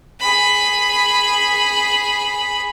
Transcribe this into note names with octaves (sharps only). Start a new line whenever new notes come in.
G#4 B5